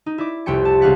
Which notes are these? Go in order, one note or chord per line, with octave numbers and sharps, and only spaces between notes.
D#4
E4 D5 D6
F1 C2 C3 G4 G5 C#7
A5
C#2 G3 F5 F#5 B6